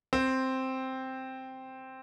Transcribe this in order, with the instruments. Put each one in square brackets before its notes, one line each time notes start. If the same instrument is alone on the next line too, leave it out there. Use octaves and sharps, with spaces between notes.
[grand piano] C4